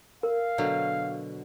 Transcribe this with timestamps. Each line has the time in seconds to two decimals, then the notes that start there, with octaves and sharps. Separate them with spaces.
0.23 A#4 F5
0.58 B2 D3 F#3